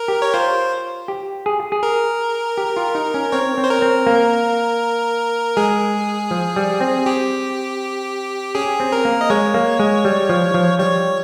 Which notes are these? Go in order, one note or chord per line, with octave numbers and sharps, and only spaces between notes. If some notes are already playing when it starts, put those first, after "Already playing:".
Already playing: A#4
G4
C#5
F4 C5
G4
G#4
G#4
A#4
G4
F4
D#4
C#4
C4 C#5
C4
C5
A#4
C4
A#3
G#3 G#4
F3
G3
C4
G4
C#4 G#4
C4
A#4
A#3
D#5
G#3 C#5
A#3
G#3
G3
F3
F3
G3 C#5